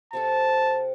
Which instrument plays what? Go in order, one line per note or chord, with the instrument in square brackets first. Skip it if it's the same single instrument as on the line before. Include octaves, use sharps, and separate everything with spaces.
[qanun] C3 C4 A4 [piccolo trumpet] A5